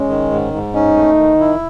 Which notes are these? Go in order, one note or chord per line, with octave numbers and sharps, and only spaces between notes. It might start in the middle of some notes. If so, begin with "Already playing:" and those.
Already playing: G#3 C#4
D#3
G#2
G#2
C#4 D#4
A3
D#3
E4